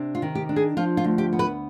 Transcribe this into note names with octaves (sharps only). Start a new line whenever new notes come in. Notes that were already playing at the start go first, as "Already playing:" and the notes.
Already playing: C3 D4
F4
D#3
G4
D4
G#4
F3 F4
F4
D2
G4
B3
B4